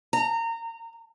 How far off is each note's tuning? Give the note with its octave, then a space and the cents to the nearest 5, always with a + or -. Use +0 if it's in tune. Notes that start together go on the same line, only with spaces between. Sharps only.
A#5 -25